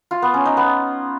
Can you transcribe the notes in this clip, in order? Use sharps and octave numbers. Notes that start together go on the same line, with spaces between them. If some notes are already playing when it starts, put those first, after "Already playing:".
F4
B3
C#4
D#4
B3